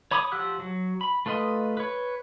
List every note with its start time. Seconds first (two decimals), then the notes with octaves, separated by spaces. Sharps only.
0.11 C#5 B5 D6 D#6
0.32 F3 G4 F#5 E6 F#6
0.60 F#3
1.01 B5
1.26 A3 F4 B4 D#5
1.77 B4 C#5